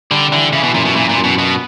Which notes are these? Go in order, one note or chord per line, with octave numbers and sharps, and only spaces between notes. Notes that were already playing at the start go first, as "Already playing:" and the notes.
D3 G3
D3 E3
C#3 E3
B2
F#2 A#2
B2
A#2 E3
A#2
F#2
B2
B2 B3